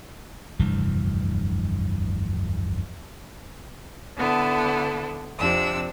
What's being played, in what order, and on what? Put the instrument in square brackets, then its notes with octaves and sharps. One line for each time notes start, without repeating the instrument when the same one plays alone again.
[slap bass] F1 D2 G2 E3
[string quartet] D3 B3 E4 A4
F2 C3 D4 E6